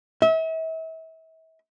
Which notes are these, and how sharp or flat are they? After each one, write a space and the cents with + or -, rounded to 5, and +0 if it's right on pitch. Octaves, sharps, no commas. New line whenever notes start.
E5 -35